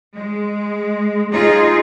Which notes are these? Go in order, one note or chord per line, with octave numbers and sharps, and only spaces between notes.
G#3
D#4 F4 G#4